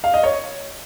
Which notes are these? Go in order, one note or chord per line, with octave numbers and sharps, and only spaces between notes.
F5
D#5
C#5